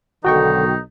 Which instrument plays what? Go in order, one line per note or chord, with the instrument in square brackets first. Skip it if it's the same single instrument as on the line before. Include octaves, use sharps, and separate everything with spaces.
[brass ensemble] B1 D#3 [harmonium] D3 [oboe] D#4 [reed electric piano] F#4 G5 C#6